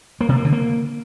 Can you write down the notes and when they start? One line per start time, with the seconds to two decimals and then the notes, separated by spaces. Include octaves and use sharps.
0.21 A#3
0.29 C3
0.37 A#3
0.45 D3
0.53 A#3